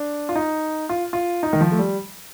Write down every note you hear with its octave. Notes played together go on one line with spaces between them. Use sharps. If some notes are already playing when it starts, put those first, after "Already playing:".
Already playing: D4
F4
D#4
F4
F4
D#4
D#3
F3
A3
G3